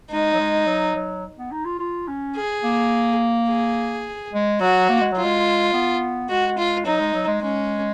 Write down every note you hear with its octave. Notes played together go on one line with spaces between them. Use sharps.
G#3 D#4
F#3
G#3
F#3
F#3
B3
D#4
F4
F4
C#4
G#4
A#3
G#4
G#3
F#3 F#4
A#3
G#3
F#3 F4
G#3
B3
G#3 F#4
F4
F#3 D#4
G#3
F#3
G#3
G#3 C#4